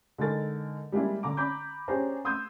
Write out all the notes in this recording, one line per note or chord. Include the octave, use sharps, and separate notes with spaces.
D3 G#3 D#4 A4 A#4 A6
G3 G#3 A#3 D4 E4
D3 A#5 D6
A#5 B5 D6 G6
C#4 D4 G4 G#4 C5 A#5
C6 D#6 E6 G6 G#6